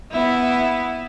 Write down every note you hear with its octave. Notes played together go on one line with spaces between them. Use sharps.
B3 E4